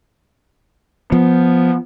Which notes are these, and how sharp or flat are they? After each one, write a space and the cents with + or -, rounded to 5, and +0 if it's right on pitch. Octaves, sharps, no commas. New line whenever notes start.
F3 +0 B3 +0